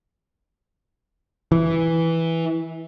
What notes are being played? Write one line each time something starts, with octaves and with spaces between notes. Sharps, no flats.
E3